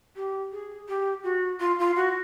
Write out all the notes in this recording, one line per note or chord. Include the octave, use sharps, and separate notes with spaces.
G4
G#4
G4
F#4
F4
F4
F#4